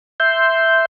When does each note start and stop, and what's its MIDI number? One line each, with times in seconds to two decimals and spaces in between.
0.20 0.85 76
0.20 0.85 84
0.20 0.85 91